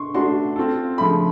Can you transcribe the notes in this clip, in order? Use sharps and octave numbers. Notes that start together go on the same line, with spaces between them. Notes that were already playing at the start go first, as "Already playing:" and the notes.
Already playing: C6 C#6
A3 D4 F#4 C6
C4 F4 A4
C#3 F3 A3 B5